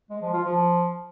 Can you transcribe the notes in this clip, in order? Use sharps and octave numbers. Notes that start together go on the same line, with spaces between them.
G#3
F3
F4
F3